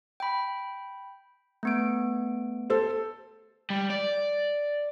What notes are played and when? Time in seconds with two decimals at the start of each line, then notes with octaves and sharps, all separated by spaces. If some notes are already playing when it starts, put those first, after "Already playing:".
0.20 G5 B5
1.63 A3 B3 D7
2.70 A4 C5
3.70 G3
3.90 D5